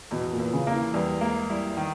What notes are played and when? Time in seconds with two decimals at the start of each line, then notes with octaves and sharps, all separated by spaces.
0.11 E2 B2
0.33 A#2
0.40 E2
0.53 C#3
0.67 A#3
0.73 E3
0.94 E2 G3
1.21 G#3 A#3
1.49 G3 E4
1.77 D#3 G3